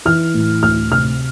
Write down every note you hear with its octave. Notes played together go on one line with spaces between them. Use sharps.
E3 F6
A2
D2 F6
C3 F6